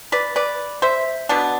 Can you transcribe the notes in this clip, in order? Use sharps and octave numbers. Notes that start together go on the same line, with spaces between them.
B4 D5
B4 D5
C5 E5
B2 B3 D4